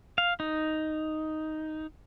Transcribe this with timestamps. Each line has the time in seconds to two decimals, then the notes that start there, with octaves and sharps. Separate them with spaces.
0.18 F5
0.40 D#4